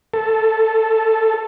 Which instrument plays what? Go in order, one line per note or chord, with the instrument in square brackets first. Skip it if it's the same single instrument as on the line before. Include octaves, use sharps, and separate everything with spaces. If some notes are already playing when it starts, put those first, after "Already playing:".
[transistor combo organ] A4